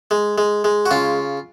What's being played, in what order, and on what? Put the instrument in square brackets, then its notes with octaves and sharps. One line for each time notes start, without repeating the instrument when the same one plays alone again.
[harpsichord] G#3
G#3
G#3
F#4
C#3 F4